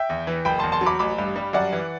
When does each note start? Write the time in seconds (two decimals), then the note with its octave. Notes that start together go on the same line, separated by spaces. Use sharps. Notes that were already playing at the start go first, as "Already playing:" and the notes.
Already playing: E5 G5
0.09 E2
0.27 E3
0.45 F#1 G5 B5
0.59 A5 C6
0.63 E2
0.72 A5 C6
0.81 F#3
0.86 B5 D6
0.99 A1 B5 D6
1.18 G2
1.36 G3
1.53 F#2 D5 F#5
1.73 E3